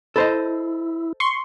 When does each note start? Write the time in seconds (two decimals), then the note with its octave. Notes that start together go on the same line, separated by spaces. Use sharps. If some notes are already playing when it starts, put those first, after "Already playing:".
0.16 E4 A4 C5 D#5
1.20 C6 C#6